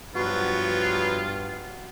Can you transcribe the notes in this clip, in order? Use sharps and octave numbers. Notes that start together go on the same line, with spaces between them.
G2 F3 F#3 B3 F4 F#4